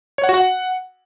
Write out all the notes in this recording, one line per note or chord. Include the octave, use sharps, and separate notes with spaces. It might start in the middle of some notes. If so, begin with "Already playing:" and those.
C#5
F#5
F#4
F#5